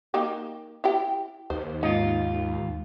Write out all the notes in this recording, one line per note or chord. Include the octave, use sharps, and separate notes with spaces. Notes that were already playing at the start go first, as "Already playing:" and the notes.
A#3 D#4 G4
E4 G4 G5
D#2 C5
G#2 D#4 F4